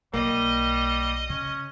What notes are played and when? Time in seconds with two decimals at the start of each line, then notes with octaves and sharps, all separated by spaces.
0.14 B1 G3 A#3 D#5
1.30 C#3 C#4